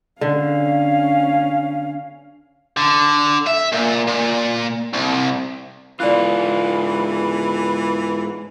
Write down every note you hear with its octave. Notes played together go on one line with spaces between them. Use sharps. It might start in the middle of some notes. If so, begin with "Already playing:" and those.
D3 C#4 F5
D3
E5
A#2
A#2
C2
G#2 E3 F4 D5 F#6